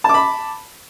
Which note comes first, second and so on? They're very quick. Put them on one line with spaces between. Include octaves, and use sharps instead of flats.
A5 D6 B5